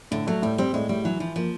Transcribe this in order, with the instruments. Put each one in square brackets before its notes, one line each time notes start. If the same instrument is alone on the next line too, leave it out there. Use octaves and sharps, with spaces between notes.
[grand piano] A2 [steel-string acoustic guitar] D3
[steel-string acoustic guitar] F#3 [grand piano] A3
[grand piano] A2 [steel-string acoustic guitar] G3
[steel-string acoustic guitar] G3 [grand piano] C4
[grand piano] A2 [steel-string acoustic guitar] G#3
[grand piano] A2 [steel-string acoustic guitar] G3
[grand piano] E3 [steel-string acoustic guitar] F#3
[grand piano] E3 [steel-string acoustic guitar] F3
[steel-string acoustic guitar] F3 [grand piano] A#3